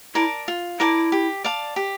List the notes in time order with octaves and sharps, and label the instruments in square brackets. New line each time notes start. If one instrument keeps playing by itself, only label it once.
[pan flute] E4 [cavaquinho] A#4 D5 A5
[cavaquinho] F4
[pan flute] E4 [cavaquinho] A#4 D5 A5
[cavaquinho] G4
D5 F5 A5
G4